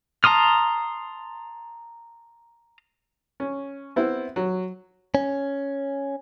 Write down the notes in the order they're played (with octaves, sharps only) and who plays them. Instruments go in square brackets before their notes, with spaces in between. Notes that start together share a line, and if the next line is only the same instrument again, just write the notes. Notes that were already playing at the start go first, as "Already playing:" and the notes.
[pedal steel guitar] A5 A#5 C6 D#6 F6
[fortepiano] C#4
B3 C4 E4
F#3
[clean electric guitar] C#4